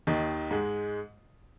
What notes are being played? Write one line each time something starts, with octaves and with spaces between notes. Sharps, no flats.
D#2 D#3
G#2 G#3